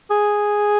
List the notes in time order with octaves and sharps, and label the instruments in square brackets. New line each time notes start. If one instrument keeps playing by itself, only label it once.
[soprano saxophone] G#4